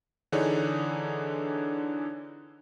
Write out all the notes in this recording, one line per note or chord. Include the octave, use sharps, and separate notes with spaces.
D3 E3 D4 D#4 G#4 C#5